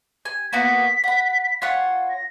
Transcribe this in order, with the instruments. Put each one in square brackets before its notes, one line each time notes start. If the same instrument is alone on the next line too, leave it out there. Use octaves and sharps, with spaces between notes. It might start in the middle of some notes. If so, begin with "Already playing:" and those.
[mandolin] G#5
[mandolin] A#3 B3 F#4 [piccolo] B6
[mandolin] F#5 B5
F4 C#5 F#5
[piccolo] A#6